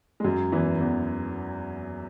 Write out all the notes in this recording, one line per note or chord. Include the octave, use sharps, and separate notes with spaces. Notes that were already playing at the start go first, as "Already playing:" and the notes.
G#3
F#2 F#3
E2 E3
E2 E3